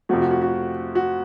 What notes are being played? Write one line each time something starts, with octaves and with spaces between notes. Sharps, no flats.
F2 C3 F3 A3 F#4
F#4
F#4
F#4
F#4